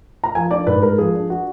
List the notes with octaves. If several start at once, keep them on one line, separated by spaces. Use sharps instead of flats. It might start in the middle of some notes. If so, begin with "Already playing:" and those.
A#5
F3 G#5
D4 D5
G#2 B4
G#3 A#4
F3 G#4
D4
F#4